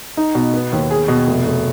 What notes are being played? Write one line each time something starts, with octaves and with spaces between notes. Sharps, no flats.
D#4
B2
B3
D#2
G#4
B2
F1
F1